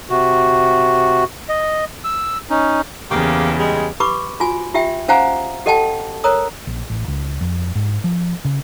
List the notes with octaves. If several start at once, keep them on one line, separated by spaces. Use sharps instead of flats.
C3 F#4
D#5
E6
C#4 D#4
E2 C#3 A#3 G4 F5
G3 G#3
G4 B4 B5 C#6 D6
F4 F#4 G#5
F4 G4 E5 G5
C#4 C5 F5 F#5 G#5 A#5
G4 A4 D#5 F#5 G5 A5
A#4 C#5 A#5 D#6
A#1
A1
C#2
F2
G#2
F3
C#3